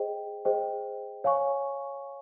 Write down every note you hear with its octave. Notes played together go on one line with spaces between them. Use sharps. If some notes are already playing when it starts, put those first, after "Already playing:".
Already playing: G#4 C5 D#5 G5
G#4 C5 D#5 G5
C#5 F5 G#5 C#6